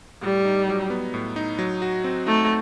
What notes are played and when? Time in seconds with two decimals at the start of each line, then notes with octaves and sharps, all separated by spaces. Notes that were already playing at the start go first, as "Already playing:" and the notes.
0.22 A2 G3
0.45 D#4
0.69 F#3
0.90 B3
1.14 A2
1.36 D#4
1.59 F#3
1.82 F#4
2.04 C4
2.26 A3 D#4